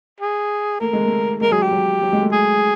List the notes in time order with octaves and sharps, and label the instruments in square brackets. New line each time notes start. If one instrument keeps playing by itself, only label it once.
[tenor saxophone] G#4
[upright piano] A3 [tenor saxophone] A#4
[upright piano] G#3
A3
[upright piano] G#3 [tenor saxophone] A#4
[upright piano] F#3 [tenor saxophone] G#4
[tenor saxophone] G4
[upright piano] F#3
F#3
G#3
A3
[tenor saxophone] G#4